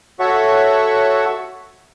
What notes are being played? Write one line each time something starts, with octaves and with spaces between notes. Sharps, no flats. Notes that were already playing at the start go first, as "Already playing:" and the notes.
F#4 A4 C#5 E5 F#5 C#6